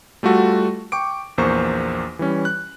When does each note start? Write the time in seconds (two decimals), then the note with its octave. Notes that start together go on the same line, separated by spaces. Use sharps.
0.23 G3 A3 F4 F#4 A4
0.92 G5 C#6 D6 D7
1.38 A#1 E2 A#3 C5 C#6
2.19 E3 G3 C#4
2.45 F#6